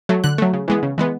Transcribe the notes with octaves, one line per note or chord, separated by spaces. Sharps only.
F#3 A3
D3 F#6
F#3 A3
C#3
E3 G#3 B3
C#3
E3 G#3 B3